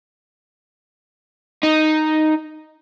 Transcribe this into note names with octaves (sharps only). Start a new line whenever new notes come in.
D#4